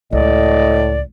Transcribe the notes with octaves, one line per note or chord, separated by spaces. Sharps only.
C#2 A2 D5 D#5